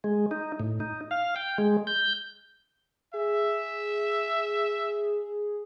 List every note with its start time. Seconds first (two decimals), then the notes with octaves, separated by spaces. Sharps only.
0.04 G#3
0.31 D#4
0.60 A2
0.80 D#4
1.11 F5
1.36 G5
1.58 G#3
1.87 G6
3.14 G#4 E5